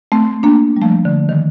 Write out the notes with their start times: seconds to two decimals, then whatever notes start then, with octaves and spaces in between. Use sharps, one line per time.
0.12 A3 C4
0.43 A#3 D4
0.77 G3
0.82 F3 A3
1.05 D3
1.29 D#3